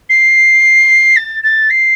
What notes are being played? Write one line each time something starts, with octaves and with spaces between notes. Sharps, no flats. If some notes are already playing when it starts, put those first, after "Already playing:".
C7
A6
A6
C7